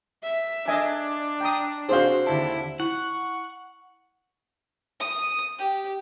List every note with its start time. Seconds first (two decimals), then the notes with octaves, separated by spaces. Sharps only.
0.23 E5
0.68 D4 D#5 E5 G#5
1.41 G5 A#5 D#6
1.89 C4 D4 F#4 G#4 C5 F5 C6
2.26 D#2 D3 E4 A5
2.80 E4 F#5 C#6
5.00 D#6
5.59 G4